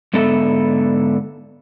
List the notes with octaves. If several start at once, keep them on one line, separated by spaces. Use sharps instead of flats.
G#2 D3 B3 A4 E5